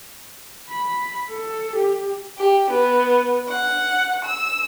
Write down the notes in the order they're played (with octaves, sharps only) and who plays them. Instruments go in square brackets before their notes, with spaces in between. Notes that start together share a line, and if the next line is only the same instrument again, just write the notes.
[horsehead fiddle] B5
A4
G4
[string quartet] G4
B3
F#5
E6